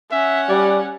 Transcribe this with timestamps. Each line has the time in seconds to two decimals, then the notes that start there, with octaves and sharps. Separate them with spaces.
0.11 C#4 E5 F#5
0.49 G3 D5